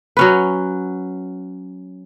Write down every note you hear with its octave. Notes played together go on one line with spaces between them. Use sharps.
F#3 C#4 B4